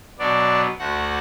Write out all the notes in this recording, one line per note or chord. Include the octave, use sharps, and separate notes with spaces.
B2 F#3 B3 D4 D5
D2 D3 A3 F#4 F#5